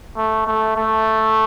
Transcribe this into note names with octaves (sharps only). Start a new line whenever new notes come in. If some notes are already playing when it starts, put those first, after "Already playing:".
A3
A3
A3